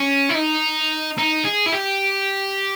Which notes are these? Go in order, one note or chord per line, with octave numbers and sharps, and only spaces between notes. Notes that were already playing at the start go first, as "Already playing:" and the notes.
Already playing: C#4
E4
D#4
D#4
G#4
E4
G4